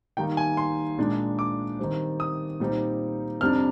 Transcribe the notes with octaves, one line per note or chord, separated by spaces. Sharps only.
D#3 G3 A#3 D#4 G5
G#5
C6
A#2 G#3 D4
D6
D#3 G3 C4
D#6
A#2 G3 C4 D#4
F2 C3 G3 D4 F6